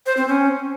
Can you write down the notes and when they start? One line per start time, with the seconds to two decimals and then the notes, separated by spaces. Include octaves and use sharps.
0.06 C5
0.17 C4
0.28 C#4